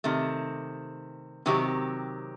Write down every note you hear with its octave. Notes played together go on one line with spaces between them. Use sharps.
C3 D#3 A3
C3 D#3 F#3 C4 G4